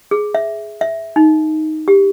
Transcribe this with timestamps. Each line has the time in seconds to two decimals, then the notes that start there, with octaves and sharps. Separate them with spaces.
0.11 G#4
0.35 E5
0.81 E5
1.16 D#4
1.88 G4